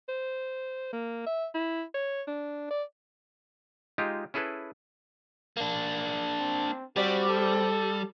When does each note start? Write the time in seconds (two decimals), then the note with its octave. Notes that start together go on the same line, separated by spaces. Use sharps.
0.09 C5
0.93 A#3
1.26 E5
1.54 E4
1.94 C#5
2.28 D4
2.70 D5
3.98 G#3 D#4 F4 G4
4.34 C#4 E4 G#4 A4 B4
5.57 A#3 D4
6.40 C4
6.96 G3 C4 F#4 G4 D5
7.29 A4